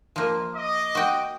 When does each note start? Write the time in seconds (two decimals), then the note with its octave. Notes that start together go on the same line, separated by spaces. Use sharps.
0.16 F3 A#3
0.54 D#5 D6
0.95 F#4 G5